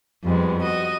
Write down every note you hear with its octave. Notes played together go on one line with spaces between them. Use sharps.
F2 G3 G#3 B3
F#4 D#5